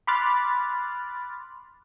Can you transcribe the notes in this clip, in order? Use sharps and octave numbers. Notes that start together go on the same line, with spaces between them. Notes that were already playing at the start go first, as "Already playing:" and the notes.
B5 C6 D6 F6 F#6 A6